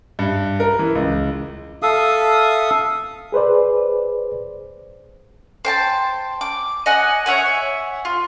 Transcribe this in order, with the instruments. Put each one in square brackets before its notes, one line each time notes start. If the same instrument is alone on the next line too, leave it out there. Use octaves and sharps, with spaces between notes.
[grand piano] G2
A#4
E3
C#2
[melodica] A4 E5 F5 D#6
[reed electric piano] G#4 B4 C5 D5
[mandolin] C5 G5 A5
D6
D#5 F#5 G#5 D#6
C#5 E5 F#5 G#5
F4